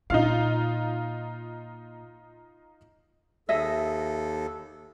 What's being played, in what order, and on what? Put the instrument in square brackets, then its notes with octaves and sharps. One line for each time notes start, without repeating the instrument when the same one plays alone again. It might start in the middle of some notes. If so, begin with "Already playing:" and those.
[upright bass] A#2 [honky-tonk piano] D#4 F4 F5
[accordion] D#2 A4 [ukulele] G#4 D#5 E5